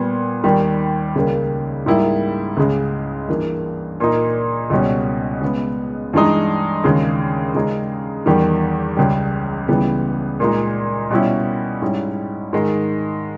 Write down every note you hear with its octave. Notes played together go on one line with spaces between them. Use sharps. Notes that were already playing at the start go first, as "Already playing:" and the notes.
Already playing: A#2 G3 B3
D#2 D#3 G3
C#2 C#3 G3 A#3
G#2 G3 A#3 E4
C#2 C#3 G#3
G2 E3 A#3
A#2 A#3 D#4
C#2 B2 G3 C#4
C#3 G#3 B3
G2 E3 G#3 D#4
D#2 C#3 G#3
C#3 G#3 D#4
E2 D#3 G3
C#2 C#3 G3
C#2 C#3 E3 G3 B3
A#2 G#3 D#4
B2 G3 C#4 E4
G#2 G3 C#4 E4
G#2 D#3 G#3